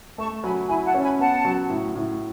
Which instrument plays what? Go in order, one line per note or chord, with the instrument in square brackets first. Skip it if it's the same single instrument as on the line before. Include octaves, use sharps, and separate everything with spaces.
[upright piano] A3 [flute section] A5 C#6
[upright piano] F#3 [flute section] G#5 B5
[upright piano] E4 [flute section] G#5 B5
[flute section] F#5 A5
[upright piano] C#4
[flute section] G#5 B5
[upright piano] B3 [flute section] F#5 A5
[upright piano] F#3
A2
A2